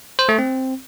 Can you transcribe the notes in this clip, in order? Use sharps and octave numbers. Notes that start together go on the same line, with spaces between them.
C5
A3
C4